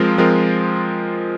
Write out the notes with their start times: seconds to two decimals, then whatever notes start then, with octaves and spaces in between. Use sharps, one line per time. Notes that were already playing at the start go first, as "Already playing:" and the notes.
Already playing: F3 G#3 C4 F4 A#4
0.18 F3 G#3 C4 F4 A#4